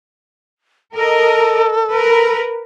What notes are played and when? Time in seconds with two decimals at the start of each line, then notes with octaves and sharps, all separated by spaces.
0.95 A4 A#4 D#5
1.92 A#4 B4